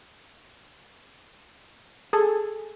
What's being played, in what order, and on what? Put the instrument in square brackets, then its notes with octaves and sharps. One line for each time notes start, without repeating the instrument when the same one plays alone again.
[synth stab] G#4 A4